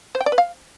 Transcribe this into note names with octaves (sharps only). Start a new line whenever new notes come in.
C5
G5
D5
B4
F5